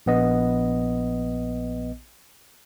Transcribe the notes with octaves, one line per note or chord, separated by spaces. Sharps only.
A#1 B3 D#5